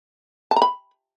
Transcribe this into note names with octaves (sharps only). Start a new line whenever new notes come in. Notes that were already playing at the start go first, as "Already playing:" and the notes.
A5
A#5
B5